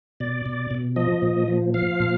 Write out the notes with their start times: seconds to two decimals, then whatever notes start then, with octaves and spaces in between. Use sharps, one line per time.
0.20 B2 D5
0.46 B2
0.71 B2
0.96 F3 D#5
1.22 A#2
1.48 F3
1.74 F3 F5
2.00 A#2